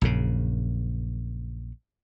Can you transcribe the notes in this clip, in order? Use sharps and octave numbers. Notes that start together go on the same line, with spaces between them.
A#1 F#2 C#3